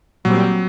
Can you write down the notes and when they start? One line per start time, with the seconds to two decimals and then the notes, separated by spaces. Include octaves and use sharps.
0.25 A#2 F#3 G3 C4